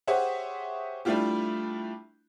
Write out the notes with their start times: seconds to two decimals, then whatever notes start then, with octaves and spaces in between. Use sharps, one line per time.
0.07 G4 G#4 C5 C#5 E5 F#5
1.05 G3 A3 D4 E4 F4 G4